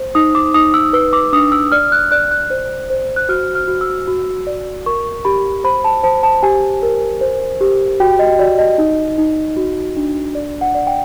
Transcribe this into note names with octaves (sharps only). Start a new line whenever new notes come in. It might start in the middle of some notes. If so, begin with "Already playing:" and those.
Already playing: C5
D#4 D#6
D6
D#4 D#6
E6
B4 E6
D6
D4 D#6
E6
D5 F6
F#6
D5 F#6
F#6
C5
C5
F#6
F#4 F6
F6
F#4
E6
F#4
D5
A#4 C#6
G4 B5
C5 B5
A5
C5 A5
A5
G4 G#5
A#4
C5
G4
F#4 G5
D#5
F#4 D5
D#5
D#4
D#4
F#4
D4
D5
F#5
D5
G5